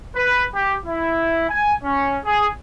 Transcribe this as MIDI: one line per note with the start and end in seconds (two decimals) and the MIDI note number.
0.15 0.43 71
0.55 0.75 67
0.86 1.45 64
1.49 1.74 80
1.83 2.18 61
2.25 2.47 68